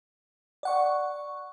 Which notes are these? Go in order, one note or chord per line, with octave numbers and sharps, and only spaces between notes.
D5 F#5 C#6